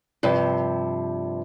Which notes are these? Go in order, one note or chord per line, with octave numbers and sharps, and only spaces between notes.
G2 C3 F3